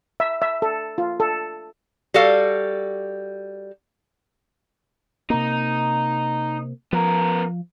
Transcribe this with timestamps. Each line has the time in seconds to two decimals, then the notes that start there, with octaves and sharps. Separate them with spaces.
0.20 E5
0.42 E5
0.62 A4
0.98 F4
1.20 A4
2.14 G3 F#4 A4 F5
5.30 C3 A#3 D#4
6.93 F3 B3 A#4